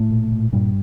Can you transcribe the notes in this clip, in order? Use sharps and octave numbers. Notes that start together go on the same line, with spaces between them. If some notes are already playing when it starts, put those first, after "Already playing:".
Already playing: A2 A3
A#2
A#2
G2 A#2 G3